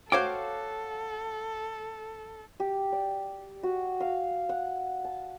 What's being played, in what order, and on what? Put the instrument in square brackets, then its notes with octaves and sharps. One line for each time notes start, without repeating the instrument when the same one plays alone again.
[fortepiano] F#4 F5 D6 [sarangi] A4 [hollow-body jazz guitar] C5 C#5 G5
[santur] G4
D5
F#4
F5
F#5
A5